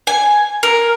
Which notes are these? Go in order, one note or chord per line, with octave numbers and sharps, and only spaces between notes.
G#5
A#4